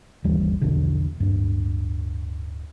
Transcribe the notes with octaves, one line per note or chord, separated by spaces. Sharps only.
G1 D#2 E3 G3
A#1 E2 B2 D3
D1 G2